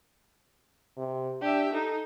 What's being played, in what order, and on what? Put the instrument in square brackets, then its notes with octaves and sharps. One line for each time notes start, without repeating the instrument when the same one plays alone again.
[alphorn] C3
[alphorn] D4 [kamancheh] G4 E5
[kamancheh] D#4 [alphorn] A4